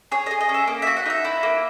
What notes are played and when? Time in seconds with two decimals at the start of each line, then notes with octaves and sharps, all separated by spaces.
0.12 G#4 C#5
0.26 G#4 D#5
0.41 D#5
0.49 C#4
0.54 E5
0.68 A#3
0.82 F#4 E5
0.97 F#5
1.06 D#4 E5
1.25 E4
1.43 A#3